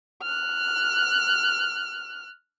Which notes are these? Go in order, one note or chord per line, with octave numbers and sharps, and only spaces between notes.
F6 F#6